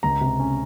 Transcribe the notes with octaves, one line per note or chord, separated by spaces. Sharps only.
C#2 A#5
C3
C#4